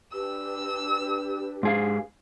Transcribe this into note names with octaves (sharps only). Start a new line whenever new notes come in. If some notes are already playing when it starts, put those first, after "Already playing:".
D4 G4 B4 E6
G#2 G#4 F5